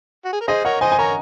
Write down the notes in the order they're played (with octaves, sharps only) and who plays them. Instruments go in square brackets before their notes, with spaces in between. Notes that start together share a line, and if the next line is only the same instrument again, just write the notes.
[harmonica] F#4
G#4
A#4
[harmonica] G#4 C5 [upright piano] D#5
[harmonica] A#4 C#5 [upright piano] F#5
[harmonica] C5 D#5 [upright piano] G#5
[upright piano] G#5
[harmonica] A#4 C#5 [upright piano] A#5